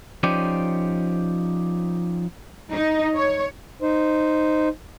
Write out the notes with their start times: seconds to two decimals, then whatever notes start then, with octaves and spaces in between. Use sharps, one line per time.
0.23 F3 C#4 D#4 G4 C5 D5
2.73 D#4
3.15 C#5
3.82 D#4 C5